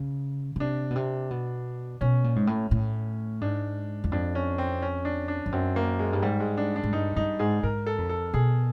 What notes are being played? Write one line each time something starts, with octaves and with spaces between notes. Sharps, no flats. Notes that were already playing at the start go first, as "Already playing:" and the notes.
Already playing: C#3
C#3
C3 D4
B2
C3
B2
B2 C#4
A#2
G#2
A2
A2
G#2 D4
E2
F2 D4
C#4
C4
C#4
D4
D4
F2
F#2 C4
A#3
G#3
G2
G#2 G3
G#3
D4
D4
G#2
G2 D#4
G2 D#4
G#2 G#4
G#2 A#4
A4
F2
A4
B2 G#4